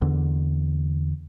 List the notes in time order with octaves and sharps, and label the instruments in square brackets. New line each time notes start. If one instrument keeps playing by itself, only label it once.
[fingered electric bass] E2 D3